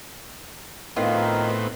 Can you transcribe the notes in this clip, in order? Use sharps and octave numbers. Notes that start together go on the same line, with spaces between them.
A2 D#3 B3 C4 F4 A#4